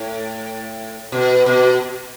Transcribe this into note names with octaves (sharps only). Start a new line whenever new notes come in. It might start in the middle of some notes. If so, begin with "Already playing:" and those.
Already playing: A2
B2
B2